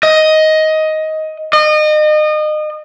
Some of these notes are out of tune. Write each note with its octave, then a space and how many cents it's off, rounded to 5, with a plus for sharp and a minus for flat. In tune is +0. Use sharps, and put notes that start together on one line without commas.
D#5 +10
D#5 -30